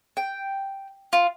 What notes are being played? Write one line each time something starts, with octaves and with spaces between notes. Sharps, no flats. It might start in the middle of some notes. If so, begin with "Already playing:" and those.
G5
F4